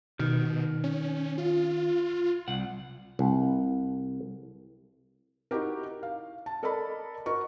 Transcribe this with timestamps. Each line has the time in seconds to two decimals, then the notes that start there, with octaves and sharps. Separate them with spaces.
0.19 B2 D#3
0.84 C#4
1.38 F4
2.48 C2 F#5
3.19 C2
5.51 D#4 E4 F#4 G4 A#4
6.03 F5
6.46 A5
6.63 A4 A#4 D5 D#5 A5 B5
7.26 F#4 A#4 D#5 C#6